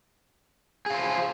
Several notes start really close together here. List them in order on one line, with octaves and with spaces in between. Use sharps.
G#4 F5 C5